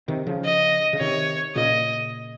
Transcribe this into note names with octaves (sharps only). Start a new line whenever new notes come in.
C3 D#3
C#3 F3
D#5
C#3
C3 D#3 C#5
A#2 C#3 D#5